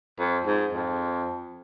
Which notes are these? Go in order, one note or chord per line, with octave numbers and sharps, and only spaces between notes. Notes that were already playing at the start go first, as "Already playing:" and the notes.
F2
G#2
F2